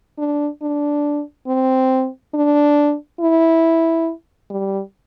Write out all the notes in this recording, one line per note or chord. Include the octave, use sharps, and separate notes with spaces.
D4
D4
C4
D4
E4
G3